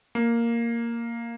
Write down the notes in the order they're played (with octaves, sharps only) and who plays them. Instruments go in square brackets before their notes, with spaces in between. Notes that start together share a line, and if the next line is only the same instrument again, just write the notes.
[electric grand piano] A#3